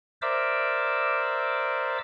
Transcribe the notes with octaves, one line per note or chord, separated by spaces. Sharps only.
A#4 C5 D5 E5 D6 E6